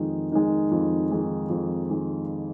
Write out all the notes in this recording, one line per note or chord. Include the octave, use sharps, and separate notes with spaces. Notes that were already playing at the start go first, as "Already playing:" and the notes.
Already playing: F2 D#3 G#3
D#3 G#3
F2
D#3 G#3
F2
D#3 G#3